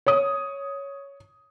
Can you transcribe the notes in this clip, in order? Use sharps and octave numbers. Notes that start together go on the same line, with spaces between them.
C#5 D#6